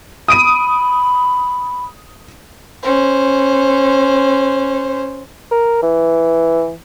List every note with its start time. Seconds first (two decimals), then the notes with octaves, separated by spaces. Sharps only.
0.28 B5 D#6 D7 D#7
2.83 C#4 C5
5.51 A#4
5.83 E3